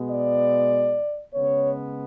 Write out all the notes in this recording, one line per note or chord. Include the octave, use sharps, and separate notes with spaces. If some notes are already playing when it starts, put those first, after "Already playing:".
Already playing: B2 G#3 B3
D5
C#3 G#3 B3 C#5